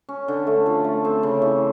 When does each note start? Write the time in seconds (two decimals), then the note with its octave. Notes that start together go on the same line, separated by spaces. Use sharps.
0.09 C#4
0.28 D3
0.47 A3
0.66 F3
0.84 A3
1.05 C4
1.23 C#3
1.42 E3